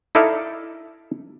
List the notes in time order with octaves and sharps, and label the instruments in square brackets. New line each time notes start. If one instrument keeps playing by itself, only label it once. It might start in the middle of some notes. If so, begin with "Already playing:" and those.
[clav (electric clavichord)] D#4 E4 A4 D5 E5 F5